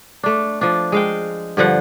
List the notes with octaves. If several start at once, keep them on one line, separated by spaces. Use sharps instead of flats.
A3 D4
F3 D4
G#3 F5 G5
G2 D3 F3 F#5